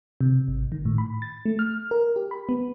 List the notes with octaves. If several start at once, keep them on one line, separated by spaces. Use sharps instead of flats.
C3
G#1
D#3
A2
B5
A6
A3
F6
A#4
G4
B5
B3